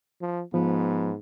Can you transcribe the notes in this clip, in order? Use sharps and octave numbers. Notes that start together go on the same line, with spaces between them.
F3
G#2 F3 B3